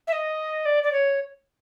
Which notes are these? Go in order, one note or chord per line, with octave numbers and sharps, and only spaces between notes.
E5
D#5
D5
D5
C#5